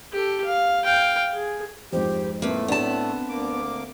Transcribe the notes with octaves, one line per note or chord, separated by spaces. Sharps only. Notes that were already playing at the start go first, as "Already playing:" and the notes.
G4 A4
F5
F5 G5
G#4
F2 G#2 G4 C5
A2 A3 A#3 C4 B4
B3 D4 D5 A5
D2 A#3 D6